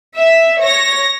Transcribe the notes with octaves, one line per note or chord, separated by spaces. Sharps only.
E5
C#5 A#6